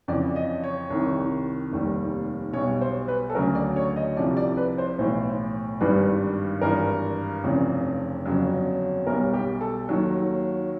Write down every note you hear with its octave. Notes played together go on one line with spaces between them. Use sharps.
F2 C#3 E3 D5
D#5
C#5
C2 C3 D#3
F1 D#2 D#3 G3
B1 B2 G3 C#5
C5
B4
A4
D2 C#3 F#3 A#4
D5
C#5
D#5
C2 C3 F3 D5
D5
B4
C5
B1 A2 E3 C5
G#1 G2 D#3 G3 B4
G#1 G2 E3 A#4
F1 F2 C#3 E3
G1 F2 C#3 F#3
B1 B2 G3 A#4
G4
A4
D#2 D#3 F#3